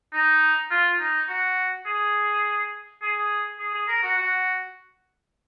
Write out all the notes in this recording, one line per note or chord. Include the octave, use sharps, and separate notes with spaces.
D#4
F4
D#4
F#4
G#4
G#4
G#4
G#4
A#4
F#4
F#4